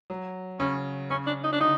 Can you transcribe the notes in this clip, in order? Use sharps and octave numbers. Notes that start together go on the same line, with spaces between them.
F#3
C#3 C#4
C#3 C#4
D4
D#4
D4
D3 D#4